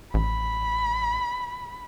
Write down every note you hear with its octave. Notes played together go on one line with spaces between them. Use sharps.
A1 B5